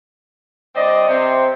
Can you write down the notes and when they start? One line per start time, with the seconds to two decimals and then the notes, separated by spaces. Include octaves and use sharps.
0.75 G2 C4 D5 D#5
1.07 C3 C4